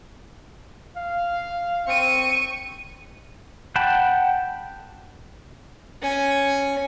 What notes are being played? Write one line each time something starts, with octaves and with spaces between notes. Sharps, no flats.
F5
C4 C#6 D#7
F#5 G5 A5 B5
C#4 G#5